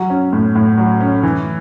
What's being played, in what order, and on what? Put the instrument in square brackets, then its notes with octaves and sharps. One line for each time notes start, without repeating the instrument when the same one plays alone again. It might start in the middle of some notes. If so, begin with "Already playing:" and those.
Already playing: [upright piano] F#3
C#4
A2
A2
F#3
C#4
E3